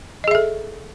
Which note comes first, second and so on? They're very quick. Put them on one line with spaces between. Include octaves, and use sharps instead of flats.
D#5 G#4 E5 A4